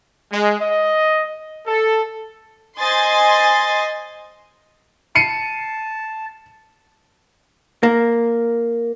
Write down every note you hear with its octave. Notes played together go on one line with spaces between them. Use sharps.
G#3
D#5
A4
C5 D#5 G#5 C6 A6
A5 C7 C#7 D#7
A#3